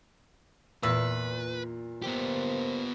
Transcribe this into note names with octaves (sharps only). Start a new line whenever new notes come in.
E2 A#2 B4 E6
A#3 B3 G4 C5